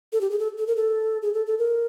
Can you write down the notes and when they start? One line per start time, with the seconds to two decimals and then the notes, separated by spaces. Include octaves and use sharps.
0.13 A4
0.21 G4
0.31 G#4
0.40 A4
0.58 A4
0.67 A#4
0.77 A4
1.22 G#4
1.34 A4
1.46 A4
1.59 A#4